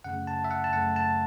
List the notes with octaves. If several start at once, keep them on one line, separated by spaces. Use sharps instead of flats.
F#2 C#3 A3 F#5
A5
E5
F#5
A5
F#2 C#3 A3 F#5
A5